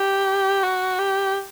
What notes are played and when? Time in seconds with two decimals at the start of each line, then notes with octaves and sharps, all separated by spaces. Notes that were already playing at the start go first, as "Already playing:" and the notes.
Already playing: G4
0.63 F#4
0.99 G4